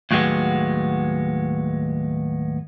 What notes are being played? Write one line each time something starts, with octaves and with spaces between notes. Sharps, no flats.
D#2 A2 F#3 G#3 B3